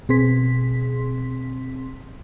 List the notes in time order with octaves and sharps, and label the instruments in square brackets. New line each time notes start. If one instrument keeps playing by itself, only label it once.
[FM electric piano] B2 C4 G#4 C6 B6